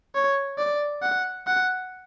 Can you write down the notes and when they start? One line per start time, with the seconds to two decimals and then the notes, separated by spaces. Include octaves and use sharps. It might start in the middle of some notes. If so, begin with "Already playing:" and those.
0.15 C#5
0.59 D5
1.02 F#5
1.47 F#5